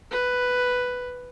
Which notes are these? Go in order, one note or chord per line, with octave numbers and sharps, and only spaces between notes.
B4